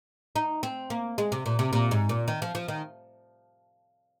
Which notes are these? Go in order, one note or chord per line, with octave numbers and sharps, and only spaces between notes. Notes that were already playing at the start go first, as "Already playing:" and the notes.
D#4
C4
A#3
G#3
C3
A#2
C3
A#2
G#2
A#2
D#3
F3
F3
D#3